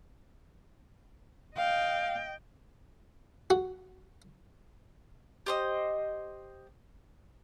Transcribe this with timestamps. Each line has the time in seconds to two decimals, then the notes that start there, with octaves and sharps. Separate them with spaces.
1.56 D#5 F5 G5
3.50 F#4
5.46 G4 C5 D#5